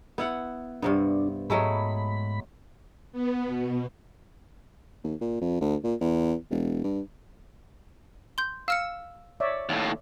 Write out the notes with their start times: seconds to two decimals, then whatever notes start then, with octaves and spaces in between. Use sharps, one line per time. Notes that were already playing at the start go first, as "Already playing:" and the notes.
0.18 B3 E4 F#5
0.82 G2 C3 B3 D4
1.50 G#2 F#3 G#3 A3 B5
3.12 B3
3.45 B2
5.04 D#2
5.21 A#2
5.42 F2
5.61 D2
5.84 A#2
6.01 E2
6.51 E1
6.84 G2
8.38 C6 G6
8.68 F5 E6 F6 C#7
9.40 C#5 D5 E5
9.69 D#2 A2